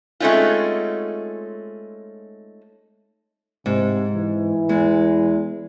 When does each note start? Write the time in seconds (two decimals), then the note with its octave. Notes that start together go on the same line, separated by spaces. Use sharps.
0.20 G#3 A3 C4 C#4 D#4 F4
3.66 G#2 C3
4.15 E3
4.69 E2 G#3